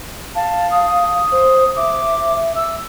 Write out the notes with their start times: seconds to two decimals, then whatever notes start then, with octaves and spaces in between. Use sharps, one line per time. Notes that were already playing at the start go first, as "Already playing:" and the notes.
0.35 F5 A5
0.71 D#6
1.31 C5
1.76 E5 D6
2.56 E6